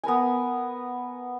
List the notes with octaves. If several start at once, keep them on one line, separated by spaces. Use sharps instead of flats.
B3 A#4 B4 G#5